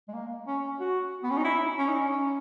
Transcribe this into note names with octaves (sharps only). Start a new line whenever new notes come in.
G#3
A#3
C#4
F#4
B3
C#4
D#4
E4
C#4
D#4
C#4